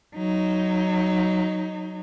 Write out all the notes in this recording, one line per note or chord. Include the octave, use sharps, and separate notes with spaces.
F#3 D#4